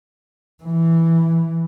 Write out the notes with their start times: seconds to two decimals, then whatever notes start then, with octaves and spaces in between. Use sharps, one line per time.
0.64 E3